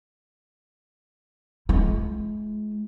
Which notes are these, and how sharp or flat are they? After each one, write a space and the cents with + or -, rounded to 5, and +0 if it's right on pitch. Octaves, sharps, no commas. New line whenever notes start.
G#3 +35 E4 +40